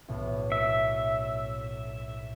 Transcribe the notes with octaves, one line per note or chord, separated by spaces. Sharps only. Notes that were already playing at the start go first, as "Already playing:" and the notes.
B1 A2
E5